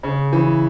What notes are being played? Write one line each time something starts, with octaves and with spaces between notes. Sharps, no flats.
C#3
E3